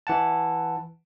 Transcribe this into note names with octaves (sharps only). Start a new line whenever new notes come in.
E3 F#5 A5